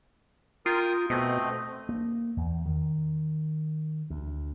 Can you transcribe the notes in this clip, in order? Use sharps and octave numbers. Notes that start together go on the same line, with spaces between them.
F4 A#4 G5 D#6
B2 A3 C4 D#5
A#3
E2
D#3
D2